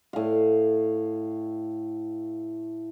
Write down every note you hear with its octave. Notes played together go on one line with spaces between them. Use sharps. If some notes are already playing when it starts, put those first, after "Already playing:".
A2 F5